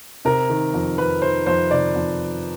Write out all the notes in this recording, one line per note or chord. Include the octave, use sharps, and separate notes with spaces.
C3 A#4
D#3
F2
F2 B4
D#3 C5
F2 C5
C3 D5
F2